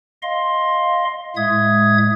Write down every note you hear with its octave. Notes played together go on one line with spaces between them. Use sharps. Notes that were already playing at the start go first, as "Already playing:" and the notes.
D#5 F5 C6
A2 G#3 E5 D#6 G#6